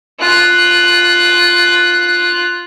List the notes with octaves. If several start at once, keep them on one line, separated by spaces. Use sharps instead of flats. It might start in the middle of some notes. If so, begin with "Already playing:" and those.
F4 F#6